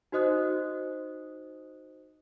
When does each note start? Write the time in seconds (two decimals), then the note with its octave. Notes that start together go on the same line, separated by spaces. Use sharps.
0.12 D#4 F#4 C5 D#5 D#6 F#6